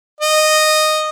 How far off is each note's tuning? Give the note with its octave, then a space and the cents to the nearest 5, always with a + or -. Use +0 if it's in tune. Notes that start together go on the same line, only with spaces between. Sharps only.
D#5 -10